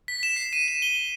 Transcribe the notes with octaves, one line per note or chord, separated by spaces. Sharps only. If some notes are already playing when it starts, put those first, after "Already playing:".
B6
E7
C7
D#7
E7
G7